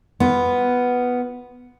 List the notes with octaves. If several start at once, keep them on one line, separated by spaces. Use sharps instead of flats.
B3 F4